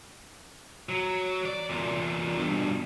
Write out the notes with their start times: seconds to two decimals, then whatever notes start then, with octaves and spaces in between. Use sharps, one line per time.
0.89 F#3
1.46 D5
1.69 E2 A#2
2.37 B1 G2